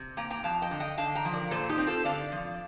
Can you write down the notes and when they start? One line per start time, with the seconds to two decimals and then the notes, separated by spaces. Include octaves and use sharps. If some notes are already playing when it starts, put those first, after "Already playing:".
Already playing: C3
0.17 A#3 G5 A#5
0.31 G5 A#5
0.44 F2 F5 A5
0.62 D#5 G5
0.71 D3
0.80 D#5 G5
0.98 D3 F5 A5
1.15 G5 A#5
1.25 F3
1.33 A#4 D5
1.51 A#2 A4 C5
1.69 D#4 G4
1.78 C4
1.87 F4 A4
2.05 D3 D5 F5
2.32 F3